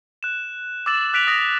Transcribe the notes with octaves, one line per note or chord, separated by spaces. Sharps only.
F#6 E7
D6 E6 A6 E7 F#7
D6 F#6 B6 D7 F7 F#7
D#6 A#6 B6 F7